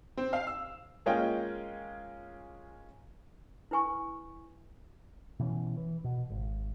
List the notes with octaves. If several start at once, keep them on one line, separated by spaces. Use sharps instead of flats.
C4
F5
E6
G#3 A#3 C#4 F4 D#5 G5
E4 B4 G#5 C#6
B2 E3 C4 C#4
E3
B2
G#1